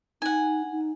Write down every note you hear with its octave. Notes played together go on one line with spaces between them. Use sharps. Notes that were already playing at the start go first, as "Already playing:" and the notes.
D#4 F#5 G#5
D#4